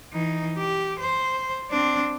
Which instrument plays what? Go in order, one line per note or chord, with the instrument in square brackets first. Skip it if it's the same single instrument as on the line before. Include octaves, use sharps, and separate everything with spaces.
[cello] E3 D#4
G4
C5
C4 D4